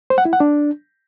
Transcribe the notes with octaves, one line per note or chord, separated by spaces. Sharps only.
C5
F#5
E4
F#5
D4